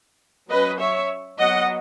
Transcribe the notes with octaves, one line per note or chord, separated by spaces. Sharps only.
F#3 C#4 B4 D#5
C#5 E5
F#3 B3 D#5 F#5